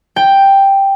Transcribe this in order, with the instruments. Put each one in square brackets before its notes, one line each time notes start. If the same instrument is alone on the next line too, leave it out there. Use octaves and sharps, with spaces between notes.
[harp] G5